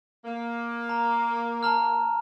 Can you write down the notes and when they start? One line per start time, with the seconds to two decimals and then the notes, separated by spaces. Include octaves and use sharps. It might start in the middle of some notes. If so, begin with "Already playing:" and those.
0.25 A#3
0.89 A#5
1.63 A5 A#5 F6